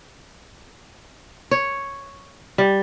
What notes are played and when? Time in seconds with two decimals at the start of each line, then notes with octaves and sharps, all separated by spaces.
1.51 C#5
2.58 G3